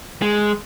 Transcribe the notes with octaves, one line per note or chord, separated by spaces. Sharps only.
G#3